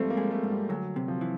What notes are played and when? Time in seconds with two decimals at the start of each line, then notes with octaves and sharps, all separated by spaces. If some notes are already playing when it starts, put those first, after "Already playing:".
Already playing: G#2 F3 G3 A3 C4
0.10 A#3
0.17 G#3
0.31 A3
0.43 G#2
0.50 G3
0.69 D2 F#3
0.96 C3
1.08 F3
1.21 E3